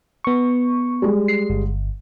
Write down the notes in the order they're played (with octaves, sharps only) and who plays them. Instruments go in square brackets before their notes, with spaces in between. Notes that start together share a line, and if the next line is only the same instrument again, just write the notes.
[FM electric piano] B3 C#6
[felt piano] G3 G#3
[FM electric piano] C7
G1